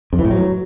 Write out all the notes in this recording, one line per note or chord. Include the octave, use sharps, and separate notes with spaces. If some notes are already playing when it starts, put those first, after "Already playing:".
F2
E3
A2
F#3